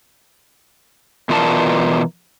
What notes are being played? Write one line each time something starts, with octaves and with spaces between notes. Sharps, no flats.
B2 E3 F4 A#4 D5 A5